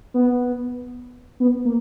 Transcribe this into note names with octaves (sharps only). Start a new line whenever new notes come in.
B3
B3
A#3